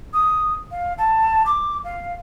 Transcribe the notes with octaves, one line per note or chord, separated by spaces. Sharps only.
D#6
F5
A5
D6
F5